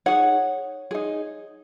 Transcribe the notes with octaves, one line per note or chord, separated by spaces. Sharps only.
D#4 G#4 C#5 F#5
D#4 G#4